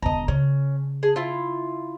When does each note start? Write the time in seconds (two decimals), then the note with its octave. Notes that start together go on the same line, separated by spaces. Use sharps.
0.02 E1 D3 D#5 A#5
0.28 C#3 C#4
1.03 G#4
1.16 E4 F4